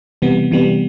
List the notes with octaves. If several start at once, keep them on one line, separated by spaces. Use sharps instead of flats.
C3 E3 G3 B3
C3 E3 G3 B3